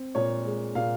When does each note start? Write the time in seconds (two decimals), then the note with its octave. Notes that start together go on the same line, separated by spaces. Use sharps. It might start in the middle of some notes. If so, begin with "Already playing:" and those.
Already playing: C4
0.15 A#2 C#5
0.45 G#3
0.75 A#2 F5